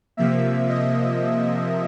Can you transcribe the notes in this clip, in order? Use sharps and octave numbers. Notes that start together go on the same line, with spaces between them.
C3 F3 A#3 E5
D#5